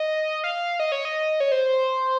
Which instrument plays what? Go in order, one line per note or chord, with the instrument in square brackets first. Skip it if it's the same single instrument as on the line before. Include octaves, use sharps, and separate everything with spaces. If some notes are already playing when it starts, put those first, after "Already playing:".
Already playing: [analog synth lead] D#5
F5
D#5
C#5
D#5
C#5
C5